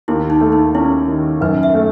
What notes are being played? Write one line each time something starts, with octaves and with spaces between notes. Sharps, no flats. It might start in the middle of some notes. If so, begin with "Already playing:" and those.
D#2 E4
D#4
A3
D#4
C#4 E4
D#3
F#2 B4
E5
A3